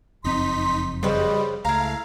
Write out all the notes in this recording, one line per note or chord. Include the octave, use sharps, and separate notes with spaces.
F#1 F2 C4 D#4 C6 B6
C#3 G3 B4 C5 D#5
C#2 A3 E4 F5 A#5